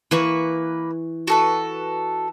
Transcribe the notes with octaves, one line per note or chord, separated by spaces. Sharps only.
E3 A#3 B4 C#6
F#4 A4 B4